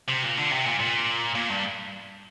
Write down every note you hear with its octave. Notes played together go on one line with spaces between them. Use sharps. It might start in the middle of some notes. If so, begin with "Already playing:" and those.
C3
A#2
D3
C3
A#2
A#2
A#2
G2